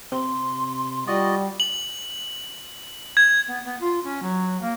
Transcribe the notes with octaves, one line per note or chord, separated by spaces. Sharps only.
C3 C6
G3 F4 F#4 D5 D#5
F#7
G#6
B3
B3
F4
C#4
F#3
A#3